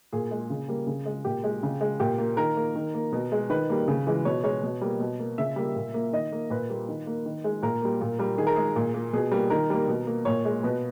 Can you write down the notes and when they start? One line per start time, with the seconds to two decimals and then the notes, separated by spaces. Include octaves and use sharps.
0.13 A#2 G#4
0.31 G#3
0.50 C#3
0.68 G3 A#3
0.87 C#3
1.06 G#3
1.25 A#2 G4
1.44 G#3
1.63 C#3
1.81 G#3
2.00 A#2 G4
2.18 A#3
2.37 D#3 A#4
2.57 A#3
2.75 D#3
2.94 A#3
3.12 B2
3.32 G#3
3.50 D#3 B4
3.70 G3 A#3
3.88 C#3
4.07 E3 G#3
4.25 B2 C#5
4.43 G#3 C#5
4.63 B2
4.81 G3 A#3
5.00 B2
5.20 A#3
5.38 C#3 E5
5.56 G3 A#3
5.75 A#2
5.94 A#3
6.13 D#3 D#5
6.32 A#3
6.50 A#2 B4
6.70 G3 A#3
6.88 D#3
7.07 A#3
7.26 D#3
7.44 G#3
7.62 A#2 A#4
7.82 G3 A#3
8.01 A#2
8.19 G3 A#3
8.38 D#3 G#4
8.47 A#4
8.56 G#3 G#4
8.76 A#2
8.94 A#3
9.13 B2 G#4
9.32 G3 A#3
9.50 D#3 A#4
9.70 G3 A#3
9.88 B2
10.07 A#3
10.25 A#2 C#5
10.45 G#3
10.63 B2 B4